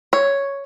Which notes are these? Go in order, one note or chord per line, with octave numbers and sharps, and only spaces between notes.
C#5